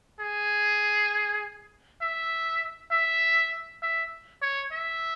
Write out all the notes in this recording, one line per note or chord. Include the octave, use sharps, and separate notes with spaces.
G#4
E5
E5
E5
C#5
E5